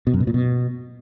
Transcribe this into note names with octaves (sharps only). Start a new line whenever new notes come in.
B2
F#2
B2
A#2
B2